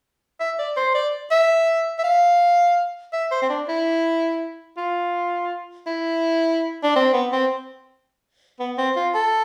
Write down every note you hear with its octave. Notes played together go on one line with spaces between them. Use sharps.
E5
D5
C5
D5
E5
E5
F5
E5
C5
C4
D4
E4
F4
E4
D4
C4
B3
C4
B3
C4
F4
A4